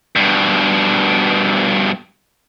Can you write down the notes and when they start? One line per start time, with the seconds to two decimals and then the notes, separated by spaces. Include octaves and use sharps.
0.16 G2 B2